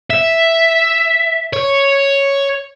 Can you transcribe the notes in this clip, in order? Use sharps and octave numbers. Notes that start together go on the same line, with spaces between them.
E5
C#5